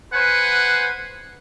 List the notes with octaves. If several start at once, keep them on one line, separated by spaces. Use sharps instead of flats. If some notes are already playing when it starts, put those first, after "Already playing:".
B4 C5 F#5 G#5